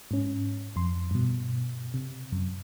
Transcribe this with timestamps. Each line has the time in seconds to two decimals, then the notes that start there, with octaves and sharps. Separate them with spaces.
0.11 G#2 C#4
0.76 F2 C6
1.11 G2 B2
1.94 C3
2.32 F#2